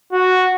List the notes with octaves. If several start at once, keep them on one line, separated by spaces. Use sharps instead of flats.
F#4